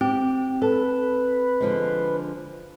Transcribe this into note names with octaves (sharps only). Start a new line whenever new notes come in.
C4 G4
A4 B4
D3 F3 G#3